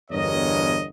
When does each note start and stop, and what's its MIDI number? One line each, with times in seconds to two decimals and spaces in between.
0.11 0.86 31
0.11 0.86 40
0.11 0.86 43
0.11 0.86 70
0.11 0.86 73
0.11 0.86 75